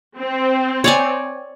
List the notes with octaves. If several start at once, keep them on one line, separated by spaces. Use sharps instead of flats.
C4
C#5 D5 G#5